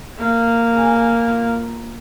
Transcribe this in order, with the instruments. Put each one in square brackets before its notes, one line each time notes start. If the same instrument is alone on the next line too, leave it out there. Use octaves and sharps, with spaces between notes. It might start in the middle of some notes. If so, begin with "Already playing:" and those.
[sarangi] A#3
[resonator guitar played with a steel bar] C#3 G#4 A#5
A#2 A#5